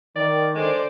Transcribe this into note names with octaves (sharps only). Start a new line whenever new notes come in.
D#3 D5
D3 G#3 C5 D5